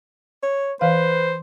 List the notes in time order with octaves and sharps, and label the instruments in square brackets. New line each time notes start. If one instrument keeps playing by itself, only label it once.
[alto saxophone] C#5
[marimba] E3 F5 [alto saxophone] B4 [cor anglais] C5